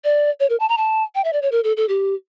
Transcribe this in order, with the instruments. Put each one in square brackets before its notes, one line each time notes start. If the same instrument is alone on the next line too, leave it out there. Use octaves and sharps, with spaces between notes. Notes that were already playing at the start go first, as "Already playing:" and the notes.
[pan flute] D5
C#5
A#4
A5
A#5
A5
G5
E5
D5
C#5
A#4
A4
A4
G4